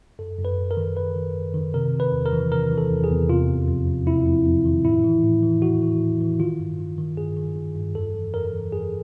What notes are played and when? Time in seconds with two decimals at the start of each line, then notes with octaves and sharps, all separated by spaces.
0.19 F#2 A4
0.38 F#2
0.45 B4
0.58 F#2
0.71 A#4
0.77 D#3
0.97 F#2 B4
1.16 D#3
1.35 F#2
1.54 D#3
1.74 C3 A#4
1.94 C3
2.00 B4
2.13 E2
2.26 A#4
2.32 E3
2.51 C3 A#4
2.71 E3
2.78 A4
2.91 E2
3.04 G#4
3.09 E2
3.29 C3 F4
3.48 F2
3.68 F2
3.87 F2
4.07 C3 E4
4.26 F2
4.46 F2
4.65 D#3
4.85 A2 E4
5.04 E3
5.24 A2
5.43 E3
5.62 E3 F#4
5.81 E3
6.01 A2
6.21 E3
6.40 D#3 F4
6.59 G2
6.79 D#3
6.98 D#3
7.17 G2 G#4
7.37 D#3
7.56 D#3
7.76 G2
7.95 F2 A4
8.15 E3
8.34 F2 A#4
8.53 E3
8.72 F2 G#4